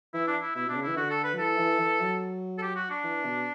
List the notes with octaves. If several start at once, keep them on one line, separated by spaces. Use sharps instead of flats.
E3 E4
D4
E4
B2 E4
B2 D4
C#3
E4
E3
D3 F#4
A4
B4
F#3
E3 A4
E3
E3
F#3
A4
G4
F#4
D4
E3
B2